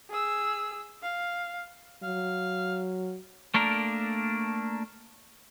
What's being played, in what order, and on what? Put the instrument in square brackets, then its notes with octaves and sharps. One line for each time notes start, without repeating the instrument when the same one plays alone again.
[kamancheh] G#4 E6
F5
[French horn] F#3 [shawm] F5
[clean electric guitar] A3 A#3 D4 A#4